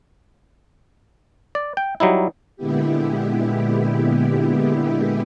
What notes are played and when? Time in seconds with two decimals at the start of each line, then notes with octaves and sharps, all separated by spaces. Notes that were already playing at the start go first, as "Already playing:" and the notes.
1.55 D5
1.77 G5
2.00 F#3 G3 D#4 E4
2.56 A#2 D3 G#3 B3 E4 G4